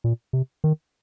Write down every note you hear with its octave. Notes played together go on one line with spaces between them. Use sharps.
A#2
C3
D#3